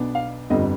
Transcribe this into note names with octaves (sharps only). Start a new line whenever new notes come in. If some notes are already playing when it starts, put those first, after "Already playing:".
Already playing: B1 B2 B3 D4
F5
G1 F2 D3 G3 D#5